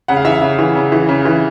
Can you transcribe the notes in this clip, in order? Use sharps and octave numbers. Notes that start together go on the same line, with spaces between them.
C#3 F#5
F5
E3 E5
F5
C#3
E3
C#3
E3
C#3
E3